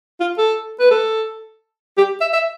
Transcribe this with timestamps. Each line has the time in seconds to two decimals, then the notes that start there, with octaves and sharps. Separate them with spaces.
0.20 F4
0.38 A4
0.80 B4
0.91 A4
1.97 G4
2.21 E5
2.33 E5